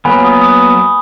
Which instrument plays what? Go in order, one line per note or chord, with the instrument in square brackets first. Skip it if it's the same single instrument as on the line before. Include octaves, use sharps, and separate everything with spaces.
[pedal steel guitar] F#3 A#3 B3 [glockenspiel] G#5 B5
[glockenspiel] D#6
D#6